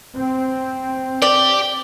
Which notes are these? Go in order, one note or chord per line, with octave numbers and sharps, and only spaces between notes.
C4
G4 D5